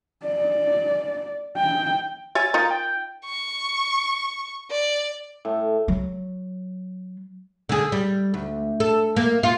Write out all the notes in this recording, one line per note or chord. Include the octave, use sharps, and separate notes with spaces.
D5
G5
C#5 E5 G#5 A6
D#4 F4 A#4
G5
C#6
D5
A2
F#3
D3 G#4
G3
D2
A4
A#3
F4